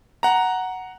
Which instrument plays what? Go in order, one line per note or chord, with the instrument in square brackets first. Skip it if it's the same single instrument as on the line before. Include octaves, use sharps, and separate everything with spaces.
[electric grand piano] F#5 A#5